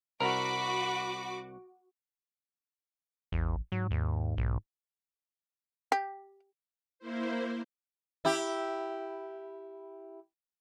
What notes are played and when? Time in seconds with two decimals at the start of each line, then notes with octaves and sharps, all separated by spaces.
0.20 C2 F#4 A#4 B5 D6
3.32 A1 E2
3.72 G#2 F#3
3.91 D#2
4.38 B1
5.92 G4
6.99 A#3 E4 C5
8.25 E4 G4